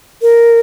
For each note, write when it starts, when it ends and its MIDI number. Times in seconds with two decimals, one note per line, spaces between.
0.22 0.60 70